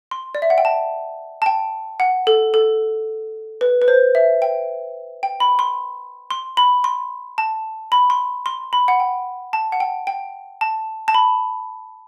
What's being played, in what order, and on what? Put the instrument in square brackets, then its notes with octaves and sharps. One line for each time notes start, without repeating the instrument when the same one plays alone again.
[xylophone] C6
D5
E5
F#5
G5
A5
A5
G5
F#5
A4
A4
B4
B4
C5
E5
G5
G5
B5
C6
C6
B5
C6
A5
B5
C6
C6
B5
F#5
G5
A5
F#5
G5
G5
A5
A5
B5